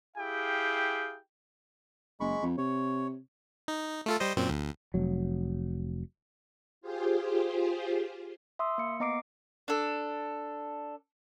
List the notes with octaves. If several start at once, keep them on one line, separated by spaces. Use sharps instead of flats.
E4 G4 G#4 F5 G5
F#1 G#3 B5 C#6
F2
C3 C#5
D#4
A3 F4 A4
G3 C5 D#5
F#2 A#2 C4
D2
F1 F#3
F4 G4 G#4 C5
E5 C6 D#6 E6
A#3 C#7
B3 D#5 A#5 D6 C7 D7
D4 A4